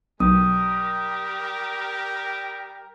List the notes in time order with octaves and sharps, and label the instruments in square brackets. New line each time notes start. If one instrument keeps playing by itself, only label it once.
[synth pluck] B1 [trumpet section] G3 G4 A#4 [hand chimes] D#6